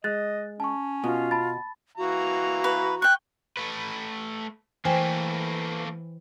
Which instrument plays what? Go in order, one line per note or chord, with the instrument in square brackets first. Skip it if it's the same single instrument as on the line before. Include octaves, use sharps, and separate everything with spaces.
[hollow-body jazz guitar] G#3 [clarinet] D#5 [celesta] F#6 A6
[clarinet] C#4 [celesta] A5 C#6
[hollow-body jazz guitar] B2 [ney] F4
[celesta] A5 B5 A6
[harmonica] E3 F5 A#5 [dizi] F#4
[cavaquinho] B4
[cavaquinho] G5 C#6 [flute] F#6
[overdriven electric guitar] A3 B4
[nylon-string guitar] E3 [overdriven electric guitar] A3 A#3 [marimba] C5 G5 G#5